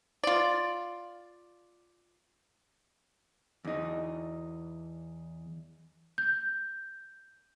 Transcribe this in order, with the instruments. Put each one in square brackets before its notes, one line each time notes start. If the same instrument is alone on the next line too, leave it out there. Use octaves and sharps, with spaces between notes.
[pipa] F4 D5
[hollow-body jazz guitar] E2 D#4
[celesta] G6